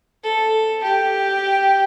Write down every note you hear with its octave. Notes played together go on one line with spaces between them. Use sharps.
A4
G4